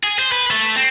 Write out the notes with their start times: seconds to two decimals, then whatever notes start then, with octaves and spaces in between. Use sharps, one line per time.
0.04 G#4
0.19 C5
0.32 B4
0.51 A3
0.76 C4